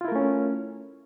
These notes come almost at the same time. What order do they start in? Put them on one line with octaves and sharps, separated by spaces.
F4 E4 A#4 A3 C#4